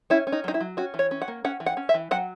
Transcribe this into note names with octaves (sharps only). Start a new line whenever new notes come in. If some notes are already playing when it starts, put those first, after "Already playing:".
C#4 E4
C#4
D#4
F#3 D#4
E4
F#3
C#4 F#4
E3
C#5
C#4
F#5
A#3
C#4 F#5
E3
F#5
C#4
E5
E3
F#3 F#5